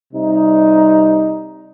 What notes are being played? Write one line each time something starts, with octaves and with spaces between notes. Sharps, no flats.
C3 G3 D#4